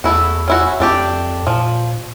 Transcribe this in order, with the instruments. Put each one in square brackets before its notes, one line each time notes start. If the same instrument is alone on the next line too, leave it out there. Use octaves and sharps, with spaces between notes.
[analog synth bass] E2 [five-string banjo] A3 E4 F#4
[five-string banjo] C#4 E4 F#4
[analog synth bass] F2 [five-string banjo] A3 D4 G4
[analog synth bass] A#2 [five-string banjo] F3